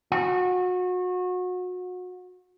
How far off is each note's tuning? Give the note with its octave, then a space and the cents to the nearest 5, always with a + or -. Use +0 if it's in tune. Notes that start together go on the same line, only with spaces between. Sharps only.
F#4 -30